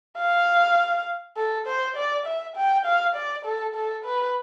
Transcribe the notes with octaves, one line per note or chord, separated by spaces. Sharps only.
F5
A4
C5
D5
E5
G5
F5
D5
A4
A4
B4